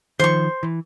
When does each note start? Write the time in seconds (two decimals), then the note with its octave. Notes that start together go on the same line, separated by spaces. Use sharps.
0.20 D#3 F3 C5 C#6
0.63 E3